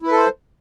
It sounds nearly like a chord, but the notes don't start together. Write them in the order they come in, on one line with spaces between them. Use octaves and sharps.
E4 B4 A4 C5